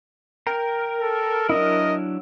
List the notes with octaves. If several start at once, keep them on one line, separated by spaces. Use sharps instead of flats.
A#4 G5 A#5
A4
F#3 D4 E4 D#5